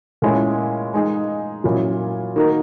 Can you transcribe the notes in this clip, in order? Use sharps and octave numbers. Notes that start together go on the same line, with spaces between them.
A#2 G#3 C#4 E4
G#3 D#4 G#4
A#2 F#3 C#4 E4
D#3 A#3 D#4 F#4 A#4